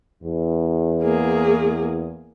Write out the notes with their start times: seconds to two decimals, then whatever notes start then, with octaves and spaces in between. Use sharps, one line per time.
0.23 E2
1.03 A#3 G#4